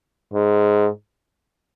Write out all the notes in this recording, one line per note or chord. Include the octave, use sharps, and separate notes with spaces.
G#2